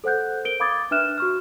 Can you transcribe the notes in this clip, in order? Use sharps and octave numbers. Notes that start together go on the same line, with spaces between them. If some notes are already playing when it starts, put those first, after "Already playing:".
A4 C5 F#5 F#6 G6
A#4 D7 G7
F5 B5 D6 D#6 G#6 A6
D4 B4 E5 F6 F#6 E7
F#4 C#6 F6